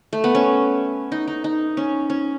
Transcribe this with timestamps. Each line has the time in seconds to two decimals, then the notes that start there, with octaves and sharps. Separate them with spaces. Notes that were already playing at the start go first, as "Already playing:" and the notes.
0.13 A3
0.24 B3
0.35 C#4
1.12 D#4
1.28 D#4
1.44 D#4
1.77 C#4
2.10 C#4